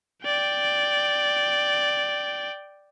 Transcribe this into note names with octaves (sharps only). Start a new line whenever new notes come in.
D5 G5